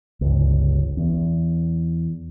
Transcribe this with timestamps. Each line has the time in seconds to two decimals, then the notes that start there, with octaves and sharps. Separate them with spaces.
0.21 G1 C#2
0.97 E2